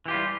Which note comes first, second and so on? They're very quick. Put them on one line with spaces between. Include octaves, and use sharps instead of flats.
E3 G4 F4 G3